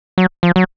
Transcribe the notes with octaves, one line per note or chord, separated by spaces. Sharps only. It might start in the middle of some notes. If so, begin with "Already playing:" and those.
F#3
F3
F#3